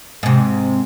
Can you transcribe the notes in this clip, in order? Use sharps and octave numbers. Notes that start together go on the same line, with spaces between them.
G#2 C3